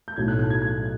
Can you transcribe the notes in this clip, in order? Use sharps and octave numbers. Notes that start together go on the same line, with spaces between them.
G6
B1 A2 F#3 A3 G#6
F#6
F#6
G#6
G#6